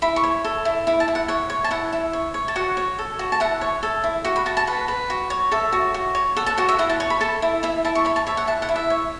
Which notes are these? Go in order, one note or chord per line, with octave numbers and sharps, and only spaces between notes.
E4 B5
C#6
C#5
A4
E4
E4 B5
A5
E4
F#5
C#5 F#5
C#5
A5
E4 F#5
E4
C#5
C#5
A5
F#4 F#5
C#5
A4
F#4
A5
E4 F#5
C#5
A4
E4
F#4 F#5
B5
F#4 A5
A5
B4 F#5
B4
F#4
C#5
A4 E5
F#4
F#4
C#5
A4 F#5
A5
F#4 F#5
E5
E4 F#5
A5
C#5 C#6
B5
A4 A5
E4
E4 E5
E4 A5
C#6
C#5 B5
A5
C#5 E5
F#5
E4 A5
F#5
E4
E5
C#5